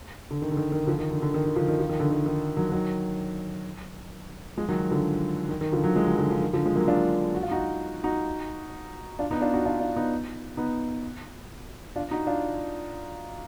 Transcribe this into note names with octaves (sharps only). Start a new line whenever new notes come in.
D3
D#3
D3
D#3
D#3
D3 F3
D#3
D3
D3
D#3
D#3
D3 F3
D#3
F3
D#3
D3
D#3
D#3
D#3 F#3
D#3 F#3
F3 G#3
D#3 F#3
D3 F3
D#3
D#3
D3 F3
D#3 F#3
F3 G#3
D#3 F#3
D3 F3
D3 F3
D#3
D3 F3
F3 G#3
F#3 A#3
D4 F4
F#4
F4
D#4 F#4
D#4 F#4
D4 F4
B3 D#4
D4 F4
D#4 F#4
D4 F4
D4 F4
B3 D#4
B3 D#4
D4 F4
D#4 F#4
D4 F4